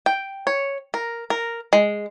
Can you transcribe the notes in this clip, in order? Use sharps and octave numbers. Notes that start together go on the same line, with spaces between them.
G5
C#5
A#4
A#4
G#3